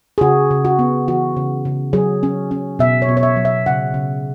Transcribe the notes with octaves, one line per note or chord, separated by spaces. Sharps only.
G#4
C#3 F#4
C#3
F#4
B3
E3 F#4
C#3
C#3
F#3 G#4
C#4
C#4
B2 E5
C#5
B2
C#5
E5
F#3
E5
C#3 F#5
C#3